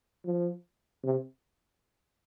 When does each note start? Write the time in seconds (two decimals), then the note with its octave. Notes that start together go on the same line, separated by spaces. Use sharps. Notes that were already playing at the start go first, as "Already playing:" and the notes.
0.25 F3
1.03 C3